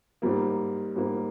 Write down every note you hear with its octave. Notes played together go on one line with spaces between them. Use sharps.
G#2 G3 A#3
G#2 G3 A#3